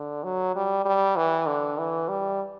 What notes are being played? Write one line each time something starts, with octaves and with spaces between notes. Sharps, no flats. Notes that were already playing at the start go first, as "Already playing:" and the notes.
Already playing: D3
F#3
G3
G3
E3
D3
E3
G3